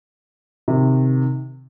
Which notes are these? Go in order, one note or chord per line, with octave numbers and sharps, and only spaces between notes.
C3 D#3